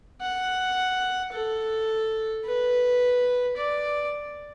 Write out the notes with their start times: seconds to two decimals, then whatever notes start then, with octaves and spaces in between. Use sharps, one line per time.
0.21 F#5
1.32 A4
2.45 B4
3.56 D5